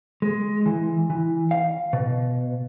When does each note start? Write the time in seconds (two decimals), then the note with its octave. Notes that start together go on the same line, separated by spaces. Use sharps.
0.22 G#3
0.66 E3
1.10 E3
1.51 F5
1.93 B2